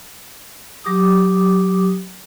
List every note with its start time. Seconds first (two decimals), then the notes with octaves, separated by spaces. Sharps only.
0.84 F#3 G4 D6 D#6